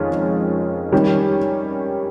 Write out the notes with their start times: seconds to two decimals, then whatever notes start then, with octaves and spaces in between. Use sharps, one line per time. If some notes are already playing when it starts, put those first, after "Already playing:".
Already playing: F2 D#3 G#3 C#4 F4
0.92 D#3 G3 C#4